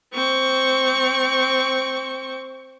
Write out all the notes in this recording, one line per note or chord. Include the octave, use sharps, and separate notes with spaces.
C4 C#6